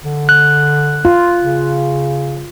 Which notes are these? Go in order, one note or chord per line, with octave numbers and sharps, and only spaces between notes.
D3
F#6
F4
C#3